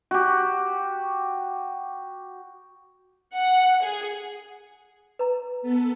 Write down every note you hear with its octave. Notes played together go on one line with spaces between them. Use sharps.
F#4 G4
F#5
G#4
B4 A#5
B3 A4